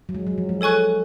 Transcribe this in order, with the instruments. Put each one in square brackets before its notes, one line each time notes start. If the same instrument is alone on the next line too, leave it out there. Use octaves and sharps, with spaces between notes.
[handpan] F#3
G#3
F#3
F3
G#3
[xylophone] A4 C#5 G#5 C#6 F#6